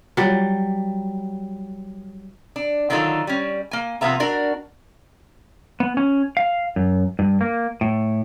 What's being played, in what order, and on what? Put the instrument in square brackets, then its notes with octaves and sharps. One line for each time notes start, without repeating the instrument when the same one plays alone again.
[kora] F#3 G3
[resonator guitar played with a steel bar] D4
D3 D#3 F#3 D#4 F4 A4
G3 C#4
A#3 G#5
C3 F3 A#3 B3 E5 A#5
D4 F#4 A#4
[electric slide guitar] B3
C#4
F5
F#2
G2
A#3
A2